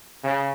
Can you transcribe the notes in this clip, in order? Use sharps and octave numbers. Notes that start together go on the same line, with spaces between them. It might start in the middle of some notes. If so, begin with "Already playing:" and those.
C#3